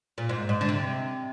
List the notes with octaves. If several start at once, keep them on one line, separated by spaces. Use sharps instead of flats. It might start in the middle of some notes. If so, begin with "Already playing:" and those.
A#2
G#2
G#2
D3
C3